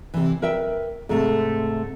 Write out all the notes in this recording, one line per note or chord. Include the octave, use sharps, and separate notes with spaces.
C3 E3
A#4 B4 E5 G5
G#2 C3 A3